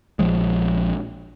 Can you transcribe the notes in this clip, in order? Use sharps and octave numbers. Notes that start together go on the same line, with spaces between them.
A#1 F3 G#3